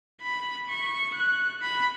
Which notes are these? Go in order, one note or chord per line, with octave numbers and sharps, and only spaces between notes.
B5
C#6
F#6
B5